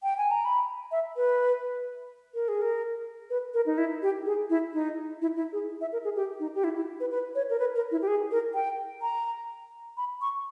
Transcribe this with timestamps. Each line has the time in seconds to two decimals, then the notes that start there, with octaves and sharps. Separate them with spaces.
0.03 G5
0.18 G#5
0.31 A#5
0.45 B5
0.92 E5
1.16 B4
2.34 A#4
2.48 G#4
2.62 A#4
3.30 B4
3.54 A#4
3.66 D#4
3.78 E4
4.02 G4
4.26 G#4
4.50 E4
4.73 D#4
5.22 E4
5.36 E4
5.53 G#4
5.81 E5
5.92 A#4
6.04 G#4
6.16 G4
6.40 D#4
6.55 G4
6.64 E4
6.76 E4
7.00 B4
7.11 B4
7.35 C#5
7.50 A#4
7.59 B4
7.75 A#4
7.91 E4
8.02 G4
8.07 G#4
8.31 A#4
8.54 G5
9.02 A#5
9.97 B5
10.21 C#6